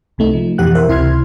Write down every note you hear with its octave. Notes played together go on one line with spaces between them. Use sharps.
C2 C3 A3 D#4
F3
F2 B2 E3 G4 F#5 F#6
A#4 C5 E5
C#2 C3 E4 C6 F6 G#6